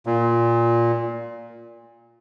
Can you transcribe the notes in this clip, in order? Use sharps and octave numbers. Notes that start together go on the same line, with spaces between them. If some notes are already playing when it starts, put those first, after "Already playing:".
A#2